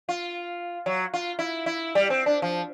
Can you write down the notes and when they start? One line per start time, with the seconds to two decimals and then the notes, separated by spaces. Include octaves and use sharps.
0.09 F4
0.86 F#3
1.14 F4
1.39 E4
1.66 E4
1.95 G3
2.10 C4
2.26 D4
2.42 F3